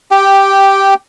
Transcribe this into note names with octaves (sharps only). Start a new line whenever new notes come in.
G4 G5